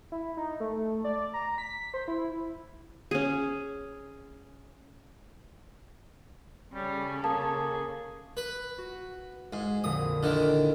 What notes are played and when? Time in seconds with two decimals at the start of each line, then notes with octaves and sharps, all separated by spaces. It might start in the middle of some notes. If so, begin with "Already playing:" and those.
0.12 E4
0.37 D#4
0.60 A3
1.04 D5
1.34 A#5
1.58 B6
1.94 C5
2.08 E4
3.11 C#4 G#4
6.75 C#3 G3 C#4 A4
7.24 A#3 G#4 A5
8.37 B4
8.78 F#4
9.53 G#2 G#4
9.84 A#1 F2 D3 D#6
10.23 D3 D#3 E4 A#4